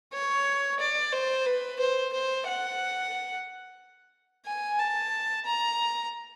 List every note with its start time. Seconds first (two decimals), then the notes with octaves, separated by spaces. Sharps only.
0.13 C#5
0.79 D5
1.12 C5
1.46 B4
1.79 C5
2.12 C5
2.46 F#5
4.46 G#5
4.79 A5
5.45 A#5